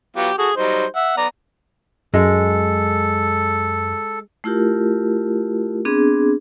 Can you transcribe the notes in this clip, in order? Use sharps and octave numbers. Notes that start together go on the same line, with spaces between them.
F#3 B3 F4 G4
F#4 G#4 A4
F#3 G3 D#4 C5
E5 F#5
B3 D5 A#5
F#2 G#3 A4
A3 E4 F4 G4 A#4
B3 C4 D4 G#4